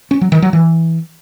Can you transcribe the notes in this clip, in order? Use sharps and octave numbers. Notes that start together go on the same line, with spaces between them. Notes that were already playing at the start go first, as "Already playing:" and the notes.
C#4
F#3
D#3
F#3
E3